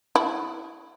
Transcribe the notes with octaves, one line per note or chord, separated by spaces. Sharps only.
E4